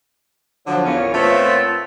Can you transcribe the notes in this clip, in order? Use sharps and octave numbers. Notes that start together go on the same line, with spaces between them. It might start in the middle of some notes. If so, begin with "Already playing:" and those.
D3 F3 F#3
E2 A#2 A#3 C#4
A#2 A3 B3 C4 F4 C#5